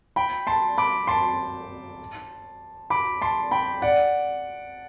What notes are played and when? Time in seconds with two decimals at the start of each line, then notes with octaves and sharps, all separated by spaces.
0.16 G5 B5
0.47 A5 C6
0.78 B5 D6
1.07 A5 C6
2.90 B5 D6
3.21 A5 C6
3.51 G5 B5
3.82 D5 F#5